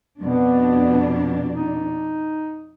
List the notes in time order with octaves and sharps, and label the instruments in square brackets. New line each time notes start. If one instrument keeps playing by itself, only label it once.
[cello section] F2 B2 D4 [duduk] B3
[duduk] D#4